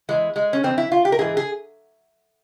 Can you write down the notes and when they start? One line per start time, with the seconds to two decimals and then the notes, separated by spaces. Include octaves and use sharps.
0.09 E2 E3 G#3
0.36 G#3
0.53 C#4
0.63 F2 E3 C4
0.78 E4
0.92 F4
1.05 G4
1.12 A#4
1.19 G#2 E3 G#4
1.37 G#4